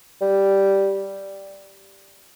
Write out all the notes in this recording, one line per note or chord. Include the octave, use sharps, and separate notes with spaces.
G3